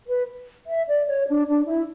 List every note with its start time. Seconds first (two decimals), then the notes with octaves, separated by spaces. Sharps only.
0.08 B4
0.68 E5
0.87 D5
1.08 C#5
1.28 D4
1.47 D4
1.67 E4